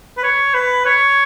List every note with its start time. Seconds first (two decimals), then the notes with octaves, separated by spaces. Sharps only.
0.17 B4
0.24 C#5
0.54 B4
0.86 C#5